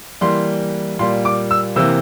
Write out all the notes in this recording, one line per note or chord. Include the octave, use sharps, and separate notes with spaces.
E3 G3 A#3 C6
A#2 G3 A#3 C6
D6
E6
C3 E3 A#3 E6